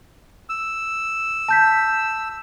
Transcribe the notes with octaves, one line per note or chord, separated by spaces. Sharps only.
E6
A5 G6 B6